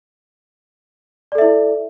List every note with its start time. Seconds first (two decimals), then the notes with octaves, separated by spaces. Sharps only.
1.32 D5
1.35 A4
1.38 E5
1.42 E4